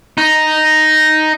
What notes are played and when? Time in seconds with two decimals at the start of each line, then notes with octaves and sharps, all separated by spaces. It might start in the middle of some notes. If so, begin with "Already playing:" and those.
0.18 D#4